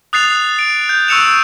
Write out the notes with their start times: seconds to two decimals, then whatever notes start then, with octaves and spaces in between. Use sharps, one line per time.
0.13 D#6 F#6 A6 C7 F7
0.59 D7
0.89 G6
1.08 C#6 E6 F#6 C#7 E7 F7